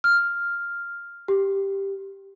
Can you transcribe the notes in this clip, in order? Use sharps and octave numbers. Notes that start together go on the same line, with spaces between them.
F6
G4